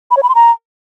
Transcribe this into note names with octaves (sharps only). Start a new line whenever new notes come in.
B5
C#5
B5
C6
A#5